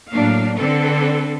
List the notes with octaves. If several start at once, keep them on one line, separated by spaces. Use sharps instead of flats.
A2 F#3 A#3 D4 F5
D3 C4 D4 A4 B4